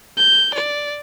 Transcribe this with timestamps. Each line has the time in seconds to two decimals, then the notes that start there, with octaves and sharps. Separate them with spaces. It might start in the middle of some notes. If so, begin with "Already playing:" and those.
0.17 G6
0.55 D5